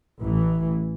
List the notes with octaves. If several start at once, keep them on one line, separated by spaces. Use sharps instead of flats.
A1 E3